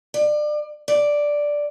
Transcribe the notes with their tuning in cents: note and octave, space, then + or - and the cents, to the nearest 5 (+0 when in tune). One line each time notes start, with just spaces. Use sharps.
D5 +30
D5 +0